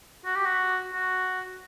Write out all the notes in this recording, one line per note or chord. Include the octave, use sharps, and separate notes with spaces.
F#4
G4
F#4
F#4